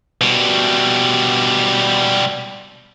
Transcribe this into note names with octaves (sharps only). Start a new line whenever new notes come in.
B2 G3